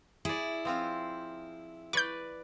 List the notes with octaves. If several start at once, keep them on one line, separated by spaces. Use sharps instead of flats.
E4 G#4 D5
F3 C4 F4
B4 D5 C#6 G6